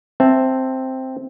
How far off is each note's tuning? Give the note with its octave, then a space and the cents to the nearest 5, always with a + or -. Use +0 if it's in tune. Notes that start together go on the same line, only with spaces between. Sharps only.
C4 +0 E5 +0 A5 +0